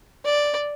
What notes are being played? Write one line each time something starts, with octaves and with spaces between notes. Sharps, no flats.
D5